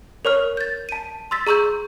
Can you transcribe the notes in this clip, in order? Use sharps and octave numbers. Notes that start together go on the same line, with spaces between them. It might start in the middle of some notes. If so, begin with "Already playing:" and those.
A#4 C#5 C#6 F6
G6 A6
A5 D#7
C6 E6 A6 B6
G#4 A#5 C#6 E6 G6